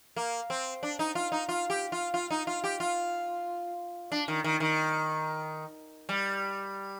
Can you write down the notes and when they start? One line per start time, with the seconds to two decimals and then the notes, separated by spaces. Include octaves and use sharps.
0.16 A#3
0.50 C4
0.83 D4
0.99 D#4
1.15 F4
1.32 D#4
1.49 F4
1.70 G4
1.92 F4
2.14 F4
2.30 D#4
2.47 F4
2.64 G4
2.80 F4
4.12 D4
4.28 D#3
4.44 D#3
4.60 D#3
6.09 G3